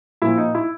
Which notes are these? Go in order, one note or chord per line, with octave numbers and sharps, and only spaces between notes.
A#2 F3 E4
D#4
E4